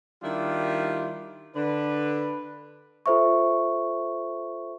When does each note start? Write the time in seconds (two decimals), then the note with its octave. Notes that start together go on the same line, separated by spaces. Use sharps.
0.23 D#3 G3 D4 E4 F4 G4
1.56 D3 D4 B4
3.06 F4 A4 C5 E5 C#6